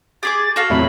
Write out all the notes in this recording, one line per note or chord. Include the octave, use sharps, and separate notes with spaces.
G4 G#4 D6 A6
F#4 A4 F5
E2 A2 C3 F#3 A3 B5